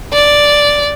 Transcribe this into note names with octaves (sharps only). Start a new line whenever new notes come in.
D5